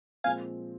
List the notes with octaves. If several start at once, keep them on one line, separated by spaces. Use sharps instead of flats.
A#2 F3 G#3 C4 F5 G#5